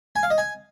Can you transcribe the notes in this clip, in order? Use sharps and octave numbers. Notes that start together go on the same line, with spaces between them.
G#5
F5
D#5
G#5